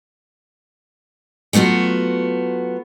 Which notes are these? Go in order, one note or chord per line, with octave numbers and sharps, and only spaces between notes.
F#3 A3 B3 F4 F#4